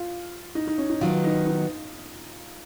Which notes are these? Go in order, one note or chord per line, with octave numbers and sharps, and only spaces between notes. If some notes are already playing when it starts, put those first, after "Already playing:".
Already playing: F4
D#4
D#4
C#4
D#4
D#3 F#3 B3 F4
D#4
D#4